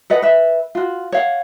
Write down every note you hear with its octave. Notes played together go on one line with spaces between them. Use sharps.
A4 B4 D#5 F#5
B4 E5
F4 F#4
C#5 F5 F#5